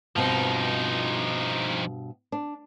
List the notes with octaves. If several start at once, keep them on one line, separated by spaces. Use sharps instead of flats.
G2 B2 F3 C4 D#4
D4